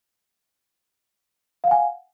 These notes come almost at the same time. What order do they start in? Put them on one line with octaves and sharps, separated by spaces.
F5 F#5 G#5